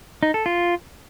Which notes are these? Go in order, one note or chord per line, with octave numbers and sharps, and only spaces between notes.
D#4
A4
F4